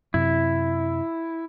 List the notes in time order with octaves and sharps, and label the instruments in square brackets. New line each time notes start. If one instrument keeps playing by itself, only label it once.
[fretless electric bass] F#2 C3 [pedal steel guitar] E4